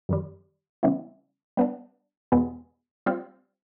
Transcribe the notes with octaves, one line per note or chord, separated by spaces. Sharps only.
F#2 D#3 G3
C#3 E3 G3 B3 E4
G3 B3 D4
E2 B2 G#3 B3
G3 C4 F4